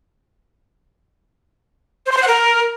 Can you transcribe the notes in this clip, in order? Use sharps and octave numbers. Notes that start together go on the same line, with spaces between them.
C5
C6
C5
F#5
A#4